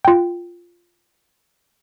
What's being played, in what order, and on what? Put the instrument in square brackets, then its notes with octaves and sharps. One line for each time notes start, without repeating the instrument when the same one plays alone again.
[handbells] F4 G5